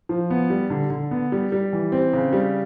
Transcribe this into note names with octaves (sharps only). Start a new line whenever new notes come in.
F3
B3
G3
D3
D3
B3
G3
G3
E3
C4
C#3
G3